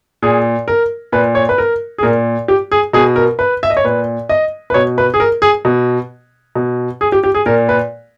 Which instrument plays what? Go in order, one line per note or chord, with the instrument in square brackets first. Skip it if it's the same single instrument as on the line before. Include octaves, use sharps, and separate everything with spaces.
[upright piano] A#2 G#4
A#4
A#2 B4
C#5
B4
A#4
G#4
A#2 A#4
G4
G#4
B2 G#4
A#4
B4
E5
D#5
C#5
A#2 B4
D#5
B4
B2 C#5
B4
G#4
A#4
G#4
B2
B2
G#4
G4
G4
G#4
A#2 A#4
B4